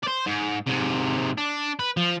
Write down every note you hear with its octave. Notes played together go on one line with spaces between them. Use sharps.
C5 D5
G#2
G#2 C3
D4
B4
F3